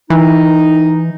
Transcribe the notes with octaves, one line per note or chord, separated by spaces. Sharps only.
E3 D#4